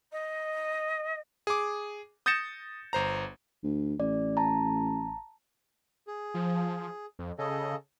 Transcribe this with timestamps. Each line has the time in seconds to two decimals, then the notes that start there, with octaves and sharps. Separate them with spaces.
0.12 D#5
1.47 G#4 D6
2.26 D#6 G6 A6 A#6 C#7 E7
2.93 G1 C5 A#5
3.63 D2
4.00 A1 D5
4.37 A5 A#5
6.07 G#4
6.34 F3
7.19 F2
7.39 C#3 G#4 A4 D#5